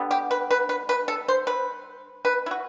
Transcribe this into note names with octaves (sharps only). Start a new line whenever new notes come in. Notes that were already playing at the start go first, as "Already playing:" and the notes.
Already playing: D3 G3 B3
G4
B4
B4
B4
B4
A4
C5
B4
B4
E4
F#4